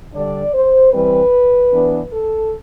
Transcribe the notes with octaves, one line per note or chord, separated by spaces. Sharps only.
D3 G3 D4 D5
C5
E3 G3 C4 B4
E3 B3 D4
A4